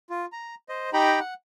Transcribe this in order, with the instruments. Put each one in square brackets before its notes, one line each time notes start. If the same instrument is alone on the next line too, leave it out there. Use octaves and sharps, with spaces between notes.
[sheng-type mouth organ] F4
A#5
C5 D#5
D#4 G4 G5 A#5 B5
F#5